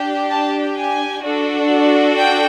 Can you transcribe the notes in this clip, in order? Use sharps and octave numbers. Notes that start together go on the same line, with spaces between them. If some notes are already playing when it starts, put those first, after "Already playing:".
Already playing: D4 G4
A5
G#5
D4 F#4 A4
G5